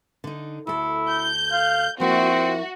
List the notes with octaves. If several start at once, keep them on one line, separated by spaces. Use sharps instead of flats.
D3 D#4
D2 E4 A4
G6
F5
F3 A#3 C4 E4 F#4